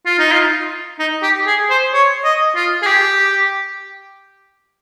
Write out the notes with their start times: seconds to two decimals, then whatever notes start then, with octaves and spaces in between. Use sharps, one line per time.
0.06 F4
0.19 D#4
0.32 F4
0.99 D#4
1.23 G4
1.46 G#4
1.70 C5
1.93 C#5
2.24 D#5
2.56 F4
2.82 G#4
2.86 G4